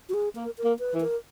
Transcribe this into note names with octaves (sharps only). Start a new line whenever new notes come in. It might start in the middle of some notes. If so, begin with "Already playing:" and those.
F#4
G#4
A#3 A#4
A#4
A#3
B4
E3
A#4